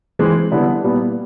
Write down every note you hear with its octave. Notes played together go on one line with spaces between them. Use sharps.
E3 G#3 C4
D3 G3 B3 E4
A#2 G3 B3 E4